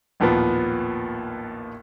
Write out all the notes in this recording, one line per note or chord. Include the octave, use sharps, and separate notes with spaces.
A1 D#2 A#2 F3 B3